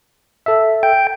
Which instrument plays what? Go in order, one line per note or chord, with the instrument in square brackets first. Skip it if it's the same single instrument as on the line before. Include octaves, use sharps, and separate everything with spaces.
[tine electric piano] A4 E5
[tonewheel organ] G5